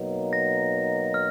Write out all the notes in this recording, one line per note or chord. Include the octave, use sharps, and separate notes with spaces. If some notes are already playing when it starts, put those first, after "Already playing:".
Already playing: B2 F#3 A#3 D#4
A#6
F6